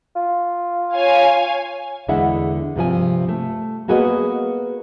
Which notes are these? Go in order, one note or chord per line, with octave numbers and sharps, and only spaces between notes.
F4
C#5 F5 G#5
E2 D3 G#3 E4 E5 F#5
G2 C3 F3 G#5
A3
A#3 B3 F#4 G#4 B4 D#5